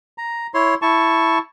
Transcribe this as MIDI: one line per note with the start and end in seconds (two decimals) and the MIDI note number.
0.18 0.47 82
0.54 0.74 64
0.54 0.74 73
0.54 0.74 84
0.82 1.38 64
0.82 1.38 81
0.82 1.38 85